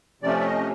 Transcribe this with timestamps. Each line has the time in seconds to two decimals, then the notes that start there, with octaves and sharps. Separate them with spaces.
0.22 C3 F3 A3 C#4 D5
0.39 E5
0.44 D#5